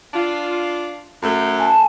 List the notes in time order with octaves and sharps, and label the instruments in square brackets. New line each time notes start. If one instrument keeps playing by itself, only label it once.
[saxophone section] D4 F4
F#2 A3
[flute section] G#5 A5